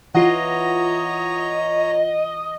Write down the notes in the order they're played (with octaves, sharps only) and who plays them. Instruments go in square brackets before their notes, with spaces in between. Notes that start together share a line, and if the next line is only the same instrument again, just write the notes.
[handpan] E3 [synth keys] F4 F#5 [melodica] C#5 A#5 [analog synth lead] D#5